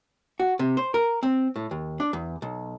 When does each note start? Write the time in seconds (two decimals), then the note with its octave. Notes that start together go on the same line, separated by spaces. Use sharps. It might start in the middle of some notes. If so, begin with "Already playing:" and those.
0.40 F#4
0.59 C3
0.77 C5
0.94 A#4
1.23 C4
1.56 A2
1.71 D#2
2.00 D4
2.13 E2
2.42 B1